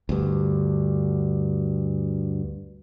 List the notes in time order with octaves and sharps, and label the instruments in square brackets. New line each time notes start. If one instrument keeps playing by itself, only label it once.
[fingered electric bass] D2 G2